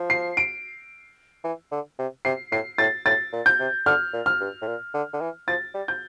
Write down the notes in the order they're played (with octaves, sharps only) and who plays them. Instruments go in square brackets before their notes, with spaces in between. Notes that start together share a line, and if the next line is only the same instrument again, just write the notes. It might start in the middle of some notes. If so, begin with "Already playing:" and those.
Already playing: [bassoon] F3
[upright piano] C7
D7
[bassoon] E3
D3
C3
[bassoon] C3 [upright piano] C7
[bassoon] A2 [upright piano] C7
[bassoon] A2 [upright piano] A6
[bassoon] A2 [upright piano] A6
[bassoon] A#2
[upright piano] G6
[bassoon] C3
[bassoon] D3 [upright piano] F6
[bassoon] A#2
[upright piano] F6
[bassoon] G2
A2
A#2
D3
D3
E3
[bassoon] F3 [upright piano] A6
[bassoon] G3
[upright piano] G6